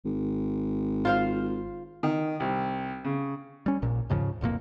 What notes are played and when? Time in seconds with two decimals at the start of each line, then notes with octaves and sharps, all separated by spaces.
0.05 G#1
1.05 F4 C5 F5
2.03 D#3
2.40 C2
3.04 C#3
3.66 G3 C#4
3.82 A#1 A#2
4.09 D#2 G#2 C#3 F3
4.41 D1 B1 F2 A#3